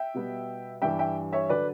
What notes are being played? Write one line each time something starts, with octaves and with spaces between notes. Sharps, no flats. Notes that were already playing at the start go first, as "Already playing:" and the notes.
Already playing: E5 G5
B2 G3 B3
G2 E3 G3 E5 G5
E5 G5
C#5 E5
D3 F#3 B4 D5